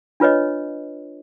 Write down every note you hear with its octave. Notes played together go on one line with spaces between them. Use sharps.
D4 F4 B4 C#5 D#5